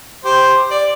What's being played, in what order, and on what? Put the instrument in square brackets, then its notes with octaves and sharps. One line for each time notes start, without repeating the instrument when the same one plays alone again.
[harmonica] G4 C5
D5